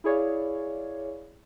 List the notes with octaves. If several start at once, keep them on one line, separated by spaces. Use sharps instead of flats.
E4 G#4 C#5 D5 F5